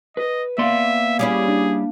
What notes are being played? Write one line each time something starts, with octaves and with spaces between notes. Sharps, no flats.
B4 D#5
A#3 B3 D5 E5 F5 C6
G3 C#4 E4 G#4
D4